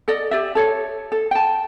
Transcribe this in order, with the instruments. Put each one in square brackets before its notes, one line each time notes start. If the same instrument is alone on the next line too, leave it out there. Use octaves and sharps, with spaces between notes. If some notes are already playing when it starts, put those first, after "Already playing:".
[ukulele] A4 D5 D#5
G4 D5 E5
A4 C#5
A4
G5 A5